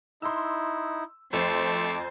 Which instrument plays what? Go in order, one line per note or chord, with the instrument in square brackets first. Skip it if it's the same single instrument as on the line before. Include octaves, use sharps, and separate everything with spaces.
[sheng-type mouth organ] D#4 E4 [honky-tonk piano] C6 E6
[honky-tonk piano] F2 [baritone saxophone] A3 [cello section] C5 [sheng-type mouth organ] A5 D6